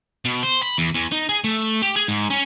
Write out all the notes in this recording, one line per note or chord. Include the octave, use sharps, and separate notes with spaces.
B2
C5
B5
E2
E2
D#4
G#4
A3
G4
G#4
G#2
C#4